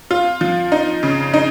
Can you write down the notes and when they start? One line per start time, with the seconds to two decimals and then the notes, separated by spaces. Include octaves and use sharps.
0.11 F4
0.41 F3
0.72 D#4
1.03 C#3
1.34 D#4